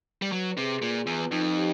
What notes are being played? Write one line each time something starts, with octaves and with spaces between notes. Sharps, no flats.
G3
F#3 B4
C3 G#4
A#2 F4
E2 B4
F2 D#4
G4